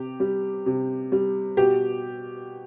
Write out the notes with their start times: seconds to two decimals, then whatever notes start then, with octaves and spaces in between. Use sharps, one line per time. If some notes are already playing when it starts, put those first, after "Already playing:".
Already playing: C3 G4
0.20 G3
0.66 C3
1.12 G3
1.57 B2 G4